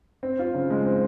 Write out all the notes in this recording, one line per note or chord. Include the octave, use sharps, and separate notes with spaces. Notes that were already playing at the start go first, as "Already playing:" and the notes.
C4
F4
C#3
G#3
C4